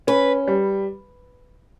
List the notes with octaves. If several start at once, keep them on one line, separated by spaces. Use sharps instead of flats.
C#4 B4
G3